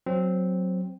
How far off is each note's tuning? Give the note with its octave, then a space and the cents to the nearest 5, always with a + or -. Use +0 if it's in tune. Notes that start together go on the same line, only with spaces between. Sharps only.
F#3 +0 C4 +0